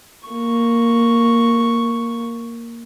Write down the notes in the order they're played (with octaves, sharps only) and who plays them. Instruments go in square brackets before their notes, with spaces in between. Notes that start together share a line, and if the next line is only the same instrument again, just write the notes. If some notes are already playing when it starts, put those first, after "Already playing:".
[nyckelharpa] A#3 C#6